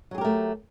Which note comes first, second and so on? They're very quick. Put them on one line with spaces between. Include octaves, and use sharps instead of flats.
F#3 G#4 G4 A#4 A3